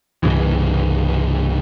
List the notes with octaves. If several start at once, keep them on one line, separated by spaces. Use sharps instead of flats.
C2 G2 C#3 E3